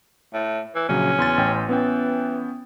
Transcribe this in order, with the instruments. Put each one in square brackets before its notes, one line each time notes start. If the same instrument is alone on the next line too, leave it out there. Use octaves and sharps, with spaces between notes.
[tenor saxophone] A2
E3
[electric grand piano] A#1 C#3 F#3 [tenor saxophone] C#4
[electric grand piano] E2 C6 A6
A1 G5 C6
[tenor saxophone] E3 [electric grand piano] B3 C#4 G5